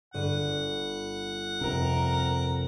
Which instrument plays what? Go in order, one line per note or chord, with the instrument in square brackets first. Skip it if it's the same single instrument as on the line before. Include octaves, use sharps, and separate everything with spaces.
[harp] G1 D#7 [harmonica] F#5
[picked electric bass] F2 C3 [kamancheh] A#4